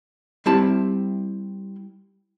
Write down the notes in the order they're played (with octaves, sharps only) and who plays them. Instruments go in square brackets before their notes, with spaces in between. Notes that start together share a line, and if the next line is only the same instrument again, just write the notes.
[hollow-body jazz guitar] G3 C4 E4 E5 A5